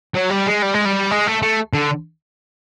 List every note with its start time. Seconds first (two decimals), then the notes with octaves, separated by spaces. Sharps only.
0.15 F#3
0.31 G3
0.47 G#3
0.63 G3
0.74 G#3
0.86 G3
1.11 G#3
1.27 A3
1.42 A3
1.74 D3